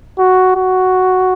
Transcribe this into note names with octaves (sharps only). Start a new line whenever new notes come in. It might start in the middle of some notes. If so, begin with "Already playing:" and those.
F#4
F#4